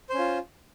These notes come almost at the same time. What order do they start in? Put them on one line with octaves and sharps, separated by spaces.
C5 C#4 F4